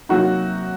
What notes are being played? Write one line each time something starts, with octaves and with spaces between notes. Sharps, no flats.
C3 F#3 A#3 D#4 F#4